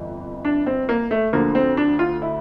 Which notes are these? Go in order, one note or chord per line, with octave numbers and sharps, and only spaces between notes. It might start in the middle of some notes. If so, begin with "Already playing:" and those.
Already playing: G1 F2 E3
D4
C4
A#3
A3
D2 D3 F3 A#3
C4
D4
F4
E4